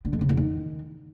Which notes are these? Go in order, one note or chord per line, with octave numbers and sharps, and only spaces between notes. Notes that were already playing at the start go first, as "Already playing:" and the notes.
D3
F2
C#3
E2
D#3